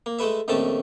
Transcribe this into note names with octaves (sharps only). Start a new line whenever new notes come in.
A#3
G#3 A3 A4 B4 E5
A#1 F2 D#3 A3 C#4 A5